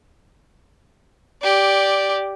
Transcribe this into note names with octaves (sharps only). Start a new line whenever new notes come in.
G4 D5